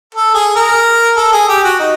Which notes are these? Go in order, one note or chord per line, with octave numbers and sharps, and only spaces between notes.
A4
G#4
A#4
A4
G#4
G4
F#4
D#4